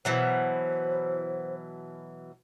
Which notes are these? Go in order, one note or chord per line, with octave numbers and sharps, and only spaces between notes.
B2 E3 F#3 C5